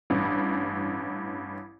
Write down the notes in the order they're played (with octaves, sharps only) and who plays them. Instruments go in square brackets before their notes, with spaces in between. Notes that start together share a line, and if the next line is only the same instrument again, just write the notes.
[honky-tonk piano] A1 G2